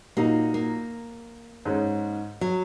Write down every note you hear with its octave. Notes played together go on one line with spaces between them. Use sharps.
A#2 F#3 A#3 D#4
A#3
G#2 G#3 C#4
F#3